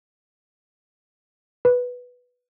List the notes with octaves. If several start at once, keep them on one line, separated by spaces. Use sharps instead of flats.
B4